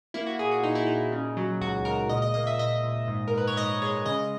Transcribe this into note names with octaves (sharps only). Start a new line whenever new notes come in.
A#3 E4
F#4
A#2 G#4
F#4
A#2 D#4
E4
A#2 D#4
C#3
F#3
C#2 F#4
C#2 A#4
A#2 D#5
D#5
A#3 D#5
E5
A#2 D#5
A#2
G#2
A#4
G#2 B4
C#5
G#2 D#5
G#3 C#5
C#3 D#5